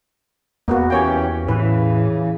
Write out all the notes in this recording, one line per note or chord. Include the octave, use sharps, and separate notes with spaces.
E2 A#3 B3 F#4
E3 C#4 G4 C#5 G5
A2 C#3 E3 B4